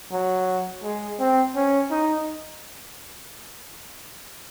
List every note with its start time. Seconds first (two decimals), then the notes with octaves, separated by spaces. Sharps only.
0.12 F#3
0.84 G#3
1.19 C4
1.56 C#4
1.91 D#4